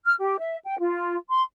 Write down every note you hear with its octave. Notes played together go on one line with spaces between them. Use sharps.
F6
G4
E5
G5
F4
C6